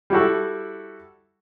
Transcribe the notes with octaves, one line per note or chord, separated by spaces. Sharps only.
G3 E4 F#4 A4